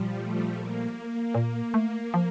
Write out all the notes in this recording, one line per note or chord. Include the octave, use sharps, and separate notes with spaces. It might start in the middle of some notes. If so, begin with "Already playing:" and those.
Already playing: A#2 F3 G3
A3
A#3
A#2
A3 A#3
F3